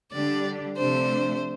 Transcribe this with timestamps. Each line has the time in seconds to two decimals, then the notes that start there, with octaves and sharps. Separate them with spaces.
0.12 D3 G3 D4 G4 D5
0.77 C3 F3 A3 D4 C5